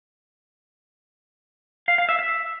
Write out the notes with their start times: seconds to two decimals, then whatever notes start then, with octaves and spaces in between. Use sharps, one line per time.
1.88 F5
1.98 F5
2.09 E5
2.19 E5